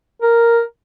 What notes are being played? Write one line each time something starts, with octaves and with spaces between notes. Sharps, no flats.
A#4